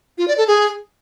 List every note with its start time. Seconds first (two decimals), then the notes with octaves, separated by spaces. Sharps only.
0.18 F4
0.28 D5
0.38 A4
0.48 G#4